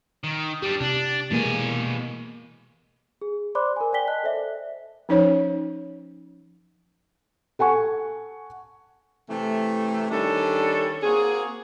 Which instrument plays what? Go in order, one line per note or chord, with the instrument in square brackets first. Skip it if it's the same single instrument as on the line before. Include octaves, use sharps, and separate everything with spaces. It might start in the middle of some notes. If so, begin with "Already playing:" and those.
[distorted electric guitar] D#3
[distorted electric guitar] G3 D4 [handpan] G4
[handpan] C3 [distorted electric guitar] D4
[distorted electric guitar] B2 G#5 [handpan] E3 G#3 A#3
[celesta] G#4
C5 D5 B5 C6 D6 F#6
A#4 G#5
D5 G5 G#5 B6 G7
D#5 A5 F#6
A4 C5 D5 E5
[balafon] F3 C#4 D#4 C5 C#5
[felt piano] A4 F#5 G#5 C#6
[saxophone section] C3 E3 A3
D#3 G3 C#4 D4 A4
A#3 C4 F#4 G#4